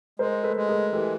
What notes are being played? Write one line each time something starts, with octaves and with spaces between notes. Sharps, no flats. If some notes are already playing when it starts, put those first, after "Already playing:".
G#3 A#4 C5
A4 B4
G#3
G#4 A#4
E3 G4 A4